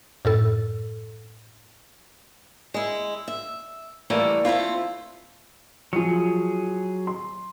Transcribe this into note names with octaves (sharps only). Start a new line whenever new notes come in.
F#2 A2 A4
G#3 E4
E5
E3 G3 A3 A#3
A3 C4 E4 F4
F3 F#3 G#4 C#7
C6